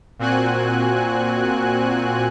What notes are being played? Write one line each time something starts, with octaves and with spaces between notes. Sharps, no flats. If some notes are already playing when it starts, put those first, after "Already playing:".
A#2 C4 F#4 G#5 F#6